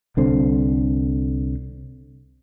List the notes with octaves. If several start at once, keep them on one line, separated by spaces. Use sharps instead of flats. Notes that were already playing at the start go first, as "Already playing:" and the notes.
C2 D3 C4